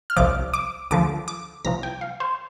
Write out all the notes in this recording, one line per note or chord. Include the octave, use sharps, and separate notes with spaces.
F6
C2 C3 F3 D6
D6
D2 D3 F3 D6
D6
C2 C3 F3 A#5
G5
F5
C5